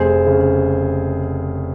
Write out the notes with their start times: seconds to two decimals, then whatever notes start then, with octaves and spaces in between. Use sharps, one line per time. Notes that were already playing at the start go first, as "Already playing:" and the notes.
Already playing: F1 G#4 C5
0.26 C#3